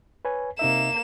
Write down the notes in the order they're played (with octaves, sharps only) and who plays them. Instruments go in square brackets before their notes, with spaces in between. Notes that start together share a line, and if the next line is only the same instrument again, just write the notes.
[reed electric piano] B4 C#5 G#5
[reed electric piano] C3 D#4 E5 [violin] A#3 E7